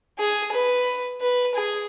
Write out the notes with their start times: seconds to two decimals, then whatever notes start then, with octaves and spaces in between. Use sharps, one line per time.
0.18 G#4
0.52 B4
1.21 B4
1.55 G#4